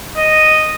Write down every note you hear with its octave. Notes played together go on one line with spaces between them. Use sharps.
D#5